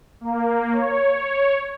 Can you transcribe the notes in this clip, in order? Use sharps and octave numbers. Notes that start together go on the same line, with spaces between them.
A#3
C#5
C#5